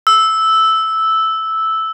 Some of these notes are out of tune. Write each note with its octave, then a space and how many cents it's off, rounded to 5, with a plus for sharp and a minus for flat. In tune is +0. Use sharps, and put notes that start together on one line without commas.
E6 -5